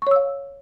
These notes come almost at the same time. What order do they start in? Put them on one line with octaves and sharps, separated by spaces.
C#6 C#5 E6 F5